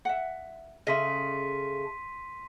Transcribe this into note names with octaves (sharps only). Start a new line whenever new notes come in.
E5 F#5
C#3 A3 D#5 E5 C6 B6 D#7